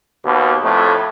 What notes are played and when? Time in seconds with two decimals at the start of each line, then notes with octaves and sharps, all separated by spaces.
0.24 D#2 B2
0.64 F2 A2 A3